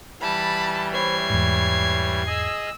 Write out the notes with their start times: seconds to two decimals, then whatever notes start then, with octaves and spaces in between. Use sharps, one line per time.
0.21 E3 G3 A5 B5
0.94 C5 C#5 E5 B5 G#6 C7
1.30 E2 G#2
2.27 G#4 D#5 E6